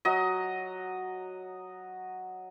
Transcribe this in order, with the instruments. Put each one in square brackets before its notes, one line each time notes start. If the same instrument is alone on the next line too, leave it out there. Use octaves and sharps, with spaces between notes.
[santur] F#3 D#5